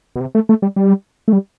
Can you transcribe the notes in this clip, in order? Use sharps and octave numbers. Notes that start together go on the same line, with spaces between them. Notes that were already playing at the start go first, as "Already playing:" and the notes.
B2
C3
A3
A3
G3
G3
A3
G3